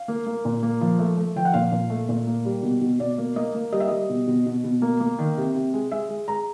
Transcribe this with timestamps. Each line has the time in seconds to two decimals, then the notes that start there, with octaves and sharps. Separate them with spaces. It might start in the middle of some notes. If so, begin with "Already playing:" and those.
Already playing: F5
0.08 A#3
0.27 A#3
0.45 A#2
0.63 A#3
0.81 F3
0.99 A3
1.17 A3
1.36 F3 G5
1.45 F#5
1.54 A#2 F5
1.72 A#2
1.90 A3
2.09 A#2
2.27 A#3
2.45 G3
2.63 B2
2.81 B2
3.00 B2 D5
3.18 A#3
3.36 A#3 D#5
3.55 A#3
3.72 G3 D#5
3.80 E5
3.87 G3 D#5
4.10 B2
4.27 B2
4.46 B2
4.64 B2
4.82 A#3
5.00 A#3
5.19 D#3
5.37 C3
5.55 C3
5.73 G#3
5.92 G#3 E5
6.09 G#3
6.28 G#3 A#5